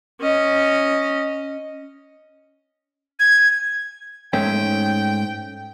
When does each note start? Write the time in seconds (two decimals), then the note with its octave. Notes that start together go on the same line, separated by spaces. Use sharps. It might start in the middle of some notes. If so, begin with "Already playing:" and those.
0.20 C#4 D#5
3.20 G#6
4.33 G#2 A3 C#4 G5